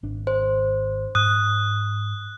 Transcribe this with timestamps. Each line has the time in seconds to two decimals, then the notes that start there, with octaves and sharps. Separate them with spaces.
0.03 G#1 D4
0.27 C5
1.15 G#2 D#6 F#6